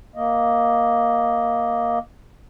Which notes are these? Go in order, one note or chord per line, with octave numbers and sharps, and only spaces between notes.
A#3 D#5